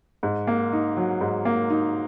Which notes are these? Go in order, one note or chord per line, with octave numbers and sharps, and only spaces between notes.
G#2
A#3
D#4
F#3
G#2
A#3
D#4